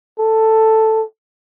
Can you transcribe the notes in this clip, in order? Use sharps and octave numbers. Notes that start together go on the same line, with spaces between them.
A4